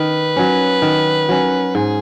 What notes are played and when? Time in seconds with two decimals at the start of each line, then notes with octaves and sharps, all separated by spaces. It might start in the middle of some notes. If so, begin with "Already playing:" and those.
Already playing: D#3 B4
0.36 F#3 C#4
0.82 D#3
1.29 F#3 C#4
1.75 G#2 G#4